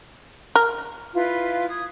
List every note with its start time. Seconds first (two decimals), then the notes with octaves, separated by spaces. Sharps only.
0.56 A#4
1.13 E4 F4 B4
1.69 D#6 G#6